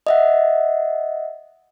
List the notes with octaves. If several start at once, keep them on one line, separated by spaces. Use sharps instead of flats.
D#5 E5 F#5